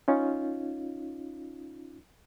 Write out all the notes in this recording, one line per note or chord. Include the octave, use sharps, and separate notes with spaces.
C#4 D#4 F4